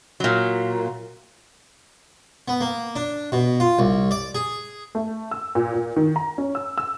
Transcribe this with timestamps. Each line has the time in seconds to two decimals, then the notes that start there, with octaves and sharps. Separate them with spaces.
0.20 A#2 F#3
2.48 B3
2.61 A#3
2.96 D4
3.32 B2
3.60 F4
3.79 C2
4.11 D5
4.35 G#4
4.95 A3
5.31 E6
5.55 A#2
5.74 A#2
5.96 D#3
6.16 A#5
6.38 C#4
6.55 E6
6.78 E6